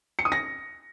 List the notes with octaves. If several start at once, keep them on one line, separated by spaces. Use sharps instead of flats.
C#7
D#6
A#6